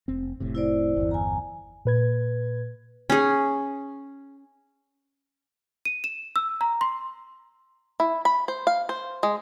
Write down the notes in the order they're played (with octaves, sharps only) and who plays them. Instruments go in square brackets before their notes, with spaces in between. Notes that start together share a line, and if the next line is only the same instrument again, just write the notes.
[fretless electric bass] F1 C4
F1 A2 C3
[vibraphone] E4 C5 D5
[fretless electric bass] G1 E2
[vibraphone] G#5 A#5
[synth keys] A#2 B4 G#6
[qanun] C#4 G#4
[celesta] D#7
E7
E6
A#5
C6
[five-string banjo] E4
B5
C5
F5
C5
G#3